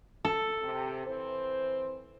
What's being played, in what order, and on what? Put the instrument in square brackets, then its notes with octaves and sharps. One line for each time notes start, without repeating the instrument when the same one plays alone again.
[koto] A4
[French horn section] C3
E3 C4 C5